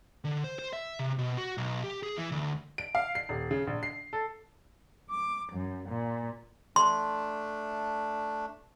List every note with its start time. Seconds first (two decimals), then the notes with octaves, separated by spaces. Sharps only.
0.24 D3
0.44 C5
0.59 C5
0.73 E5
0.99 C3
1.18 B2
1.38 F#4
1.58 B1
1.84 G4
2.03 G#4
2.17 E3
2.32 D2
2.78 D7
2.95 F5
3.15 C7
3.29 D#1
3.51 C#3
3.67 A#1
3.83 C7
4.13 A4
5.10 D6
5.52 F#2
5.88 A#2
6.76 A3 D4 C6